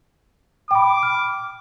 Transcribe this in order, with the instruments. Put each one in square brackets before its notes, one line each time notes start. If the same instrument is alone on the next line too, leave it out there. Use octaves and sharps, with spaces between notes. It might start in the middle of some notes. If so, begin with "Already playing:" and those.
[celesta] G5 B5 [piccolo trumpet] D6
[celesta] F6